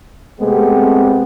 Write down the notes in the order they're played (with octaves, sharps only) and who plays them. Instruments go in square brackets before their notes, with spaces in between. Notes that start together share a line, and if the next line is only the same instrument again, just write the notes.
[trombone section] C3 G#3 A3 B3 C4 G4